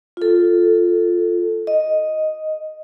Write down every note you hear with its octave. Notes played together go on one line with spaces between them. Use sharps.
F4 A4
D#5